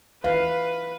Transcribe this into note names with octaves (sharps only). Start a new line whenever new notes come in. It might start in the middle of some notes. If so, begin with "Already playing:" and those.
E3 B4 F5